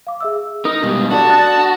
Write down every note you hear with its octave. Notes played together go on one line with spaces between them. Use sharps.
F5 D6
G#4 E5 E6
D#4 A#4 D#6
G#2 B2 G3
D4 F#4 A4 D5 A5
D#6 F#6 A6